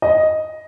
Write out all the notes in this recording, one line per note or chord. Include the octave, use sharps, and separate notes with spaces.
D#5